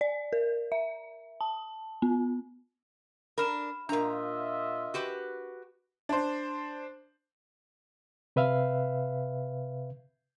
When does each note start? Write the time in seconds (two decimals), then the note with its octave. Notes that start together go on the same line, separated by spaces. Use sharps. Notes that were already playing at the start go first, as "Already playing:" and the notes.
0.01 D5
0.33 A#4
0.72 E5
1.41 A5
2.02 B3
3.38 D4 A#4 B5 F6 E7
3.89 A#2 D4 F4 A#4 D#5 E5 A#5
4.94 F#4 G4 B4
6.09 D4 C5
8.36 C3 B4 E5 F5